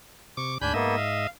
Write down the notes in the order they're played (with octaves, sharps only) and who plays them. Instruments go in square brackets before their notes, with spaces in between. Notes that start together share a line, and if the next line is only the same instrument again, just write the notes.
[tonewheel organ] C3 D6 [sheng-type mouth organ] C#6
[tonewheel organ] D2 G#2 B5 [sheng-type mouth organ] D4 G#5 G6
[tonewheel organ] G#2 D#5 E5 [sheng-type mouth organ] A#3 B3
[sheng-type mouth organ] F5